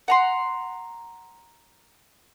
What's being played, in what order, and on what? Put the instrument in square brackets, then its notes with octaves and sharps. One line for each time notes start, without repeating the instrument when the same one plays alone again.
[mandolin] F#5 A#5 C6